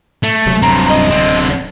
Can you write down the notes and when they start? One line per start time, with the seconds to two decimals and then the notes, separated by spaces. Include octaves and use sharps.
0.23 A3
0.46 D1 C3 F#3
0.62 G2 C4 A#5
0.89 D#5
1.10 D3 C4